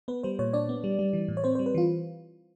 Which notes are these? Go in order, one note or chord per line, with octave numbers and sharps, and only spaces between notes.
B3 B4
G3 C5
A#2 C#5
D4 D5
B3
G3
G3
E3
A2
C#5
C4 C5
G3 C5
B4
E3 F4